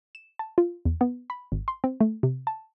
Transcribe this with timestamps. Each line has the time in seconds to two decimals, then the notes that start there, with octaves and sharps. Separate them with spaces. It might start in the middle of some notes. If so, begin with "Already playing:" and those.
0.15 E7
0.39 A5
0.58 F4
0.85 E2
1.01 B3
1.30 B5
1.52 G#1
1.68 C6
1.84 C4
2.01 A3
2.23 C3
2.47 A5